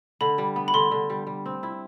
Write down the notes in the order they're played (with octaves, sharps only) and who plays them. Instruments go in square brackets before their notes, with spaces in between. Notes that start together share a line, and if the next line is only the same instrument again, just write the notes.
[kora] D3 [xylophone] B5
[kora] G3
B3
[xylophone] B5
[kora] D3 [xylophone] C6
[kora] D3
G3
G3
C4
E4